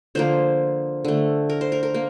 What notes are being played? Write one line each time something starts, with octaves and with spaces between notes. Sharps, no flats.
D3 F3 A#3 C5
D3 A3
A#4
C5
A#4
A#4
A#3